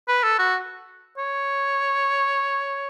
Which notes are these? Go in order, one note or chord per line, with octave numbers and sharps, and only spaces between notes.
B4
A4
F#4
C#5